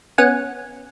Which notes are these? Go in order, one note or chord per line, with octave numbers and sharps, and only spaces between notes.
B3 C#4 F#5 G#5